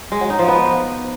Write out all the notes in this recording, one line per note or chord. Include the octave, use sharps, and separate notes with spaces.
G#3
F#3
D#4
F3
B3